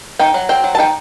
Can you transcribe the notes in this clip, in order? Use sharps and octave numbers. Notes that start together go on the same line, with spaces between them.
D#4 G5
F#3
C4 G5
F#3
A5
D#4 G5